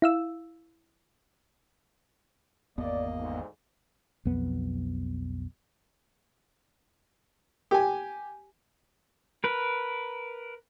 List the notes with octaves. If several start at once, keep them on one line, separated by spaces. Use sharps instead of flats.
E4 F5 E6
G#1 E2 A#3 B3 D5 D#5
D2 G#2
B1 F2 B3
G4 G#5
A#4 B4